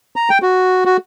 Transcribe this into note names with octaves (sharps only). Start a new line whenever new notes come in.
A#5
G5
F#4
F#4